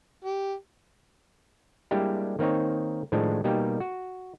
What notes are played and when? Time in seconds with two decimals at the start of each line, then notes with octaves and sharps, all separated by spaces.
0.24 G4
1.91 G3 G#3 A#3 D4 E4 G4
2.39 D#3 A#3 C4 D#4 C#5
3.12 A2 D#3 F3 G#3 D4
3.44 B2 G3 A#3 D#4 G4
3.80 F#4